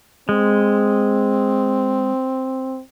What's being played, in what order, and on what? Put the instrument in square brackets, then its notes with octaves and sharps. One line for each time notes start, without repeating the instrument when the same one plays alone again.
[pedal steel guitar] G#3 [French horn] C4